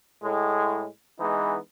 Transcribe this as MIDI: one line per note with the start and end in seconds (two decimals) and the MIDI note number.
0.23 0.87 45
0.23 0.87 56
1.20 1.57 52
1.20 1.57 56
1.20 1.57 59
1.20 1.57 63